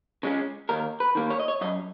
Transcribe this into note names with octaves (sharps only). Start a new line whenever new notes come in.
C#3 G#3 C#4
D#2 A#4
B4
D#3 A#3
C#5
D#5
C#5
F#2 D#5